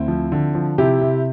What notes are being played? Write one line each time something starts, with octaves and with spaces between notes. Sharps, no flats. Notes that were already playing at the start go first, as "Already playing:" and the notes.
Already playing: D2 C4 E4
F3
D3
F3
C3 E4 G4
C3